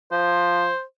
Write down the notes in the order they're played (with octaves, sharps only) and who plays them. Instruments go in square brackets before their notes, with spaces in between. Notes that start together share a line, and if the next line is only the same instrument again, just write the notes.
[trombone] F3 [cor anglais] C5